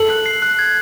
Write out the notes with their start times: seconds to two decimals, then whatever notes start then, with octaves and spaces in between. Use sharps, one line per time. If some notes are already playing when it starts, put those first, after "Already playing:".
Already playing: A4 F#7
0.10 F#6
0.26 C7
0.42 F#6
0.59 G#6